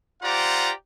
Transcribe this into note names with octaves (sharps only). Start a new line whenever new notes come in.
F4 G4 C5 D5 F#5 A#5